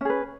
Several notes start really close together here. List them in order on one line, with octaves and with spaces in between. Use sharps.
C#4 G#4 B4